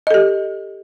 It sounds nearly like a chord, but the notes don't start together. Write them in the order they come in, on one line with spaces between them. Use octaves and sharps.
D#5 A4 G4